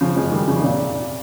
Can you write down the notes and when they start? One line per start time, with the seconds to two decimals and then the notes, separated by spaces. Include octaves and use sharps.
0.01 C#3 F3
0.17 F3 G#3
0.32 D#3 G3
0.48 C#3 F3
0.59 D#3
0.63 A#2 C#3
0.74 C3